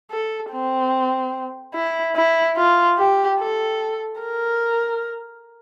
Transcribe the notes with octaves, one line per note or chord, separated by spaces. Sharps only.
A4
C4
E4
E4
F4
G4
A4
A#4